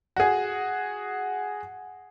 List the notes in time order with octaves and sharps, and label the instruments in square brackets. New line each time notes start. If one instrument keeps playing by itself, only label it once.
[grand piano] F#4 G#4